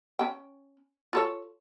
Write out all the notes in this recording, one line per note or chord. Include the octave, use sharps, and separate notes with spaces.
C#4 G5
F4 A4 C#5